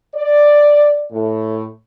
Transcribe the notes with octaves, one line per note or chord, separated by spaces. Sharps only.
D5
A2